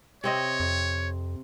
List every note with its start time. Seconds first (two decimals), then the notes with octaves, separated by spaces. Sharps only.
0.24 C3 C4 C#5 D#5
0.60 F2